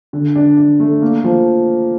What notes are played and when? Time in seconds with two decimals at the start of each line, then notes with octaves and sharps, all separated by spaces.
0.13 D3
0.36 D4
0.57 D4
0.80 A3
1.02 A#3
1.24 F3